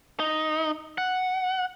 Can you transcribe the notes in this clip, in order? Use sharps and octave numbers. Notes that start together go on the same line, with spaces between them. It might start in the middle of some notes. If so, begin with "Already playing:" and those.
D#4
F#5